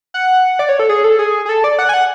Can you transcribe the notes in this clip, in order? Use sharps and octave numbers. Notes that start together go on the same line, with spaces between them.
F#5
D5
C#5
A4
G#4
A4
G#4
G#4
A4
D5
F#5
G#5
F#5